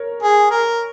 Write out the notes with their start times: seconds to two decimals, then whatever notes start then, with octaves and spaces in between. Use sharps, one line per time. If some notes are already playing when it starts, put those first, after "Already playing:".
Already playing: A#4 C#5
0.23 G#4
0.51 A#4